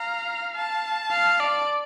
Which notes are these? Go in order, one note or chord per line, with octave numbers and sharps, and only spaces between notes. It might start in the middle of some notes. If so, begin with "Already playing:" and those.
Already playing: F5 A#5
A5
F5
D5